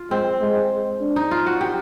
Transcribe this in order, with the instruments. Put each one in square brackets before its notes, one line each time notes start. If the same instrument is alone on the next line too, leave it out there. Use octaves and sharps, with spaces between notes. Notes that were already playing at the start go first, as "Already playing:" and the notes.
Already playing: [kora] F4
[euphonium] G#3 [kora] C4
[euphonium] G#3
D4
[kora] D#4
F4
F#4
G4